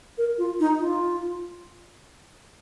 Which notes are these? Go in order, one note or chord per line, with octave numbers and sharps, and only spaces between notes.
A#4
F4
D#4
F4